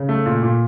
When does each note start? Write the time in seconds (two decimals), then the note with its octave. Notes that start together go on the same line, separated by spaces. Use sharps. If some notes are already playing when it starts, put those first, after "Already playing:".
Already playing: C#3
0.09 A3
0.26 A#2
0.43 A#2